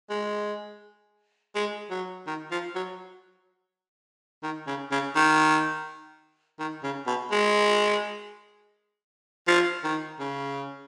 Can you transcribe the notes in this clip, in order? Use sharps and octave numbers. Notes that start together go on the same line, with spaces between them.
G#3
G#3
F#3
D#3
F3
F#3
D#3
C#3
C#3
D#3
D#3
C#3
B2
G#3
F3
D#3
C#3